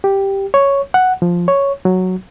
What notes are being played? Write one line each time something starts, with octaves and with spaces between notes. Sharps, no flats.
G4
C#5
F#5
F3
C#5
F#3